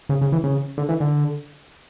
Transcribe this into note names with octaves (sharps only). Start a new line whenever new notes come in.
C#3
C#3
E3
C#3
D3
E3
D3